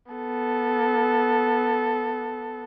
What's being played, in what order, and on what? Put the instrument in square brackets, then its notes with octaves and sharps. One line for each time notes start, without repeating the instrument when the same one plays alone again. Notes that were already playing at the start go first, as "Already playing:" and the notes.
[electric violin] B3 A4